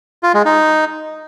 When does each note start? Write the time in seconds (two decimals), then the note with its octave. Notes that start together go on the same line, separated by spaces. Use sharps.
0.23 F4
0.34 G#3
0.45 D#4